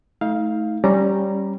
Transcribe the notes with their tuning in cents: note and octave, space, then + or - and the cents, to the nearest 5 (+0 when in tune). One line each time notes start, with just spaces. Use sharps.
A3 -20 D#4 +35 F5 +0
G3 -5 C#4 -15 A#5 +0